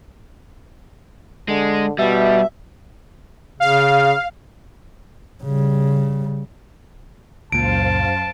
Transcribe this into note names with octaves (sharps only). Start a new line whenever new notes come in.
D3 G#3
B2 G3 E5
C#3 F5
C#3 G3
C#2 F#2 A#2 C5 F5 A5 D7